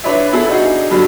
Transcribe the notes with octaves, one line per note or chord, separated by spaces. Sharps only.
D4 E4 B4 C#5 D5 E5
B3 E4 G#4 A4
D4 D#4 F#4 G#4
G2 D3 F#3 G3 B5